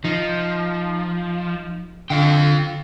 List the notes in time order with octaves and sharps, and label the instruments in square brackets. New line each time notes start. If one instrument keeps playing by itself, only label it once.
[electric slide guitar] F3 [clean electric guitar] D#4
[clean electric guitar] D3 [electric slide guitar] F4 F5 G5